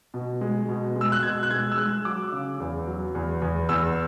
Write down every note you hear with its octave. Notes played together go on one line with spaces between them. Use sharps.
B2
G#3
B2
G#3
E6
F#6
B2 G#6
F#6
G#3 G#6
E6
G#3 F#6
F#3 D6
C#3
E2
F#3
E2
E2
E2 E6